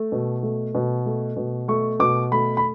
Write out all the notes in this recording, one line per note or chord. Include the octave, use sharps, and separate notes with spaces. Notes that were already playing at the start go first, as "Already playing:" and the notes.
Already playing: A3
B2
A3
B2
A3
B2
A3 C#6
B2 D6
A3 B5
B5